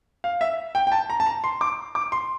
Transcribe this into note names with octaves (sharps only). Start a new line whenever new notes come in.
F5
E5
G5
G5
A5
A#5
A5
A#5
C6
D6
D6
C6